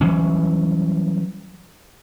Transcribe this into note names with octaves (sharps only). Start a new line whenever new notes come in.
E3 F#3 G3 C#4